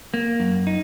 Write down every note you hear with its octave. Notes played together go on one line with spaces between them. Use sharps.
A#3
F#2
D#4